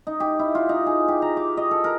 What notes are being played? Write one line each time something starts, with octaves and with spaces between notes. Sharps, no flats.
D#4
G4
E4
F4
D#4
G#4
G4
A#5
D6
D#5
A4
A#4